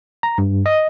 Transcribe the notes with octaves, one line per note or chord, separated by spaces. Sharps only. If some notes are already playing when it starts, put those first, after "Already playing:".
A#5
G2
D#5